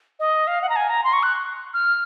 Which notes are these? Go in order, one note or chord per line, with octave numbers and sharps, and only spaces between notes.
D#5
F5
F#5
A#5
G#5
A#5
C6
C#6
F#6
F6